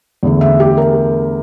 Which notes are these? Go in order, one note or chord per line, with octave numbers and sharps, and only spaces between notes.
E2 D3 A3
E5
G4
A#4